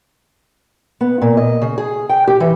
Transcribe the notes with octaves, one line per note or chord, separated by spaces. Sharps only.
B3
A#2
D#5
C#3
G#4
G5
G4
E3